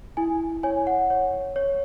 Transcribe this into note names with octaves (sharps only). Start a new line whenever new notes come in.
E4 G#5
C#5 G#5
F#5
C#5
C#5